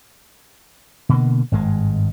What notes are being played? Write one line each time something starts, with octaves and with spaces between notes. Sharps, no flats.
B2 D3 A#3
G#1 G2 C3 G#3